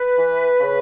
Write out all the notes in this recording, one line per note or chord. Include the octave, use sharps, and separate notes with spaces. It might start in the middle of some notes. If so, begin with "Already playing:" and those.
Already playing: B4
E3
C#3